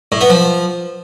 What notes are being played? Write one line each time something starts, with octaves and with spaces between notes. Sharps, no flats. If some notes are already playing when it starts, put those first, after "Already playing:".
A2
B3
F3